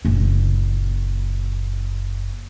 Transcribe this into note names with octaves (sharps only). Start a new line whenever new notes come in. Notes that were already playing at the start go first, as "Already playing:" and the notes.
F#1 A#2